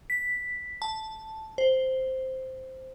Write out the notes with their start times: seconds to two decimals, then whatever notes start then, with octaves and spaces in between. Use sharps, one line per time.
0.10 B6
0.82 A5
1.58 C5